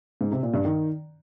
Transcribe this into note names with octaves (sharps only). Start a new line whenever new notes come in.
G#2
C3
A#2
G2
D#3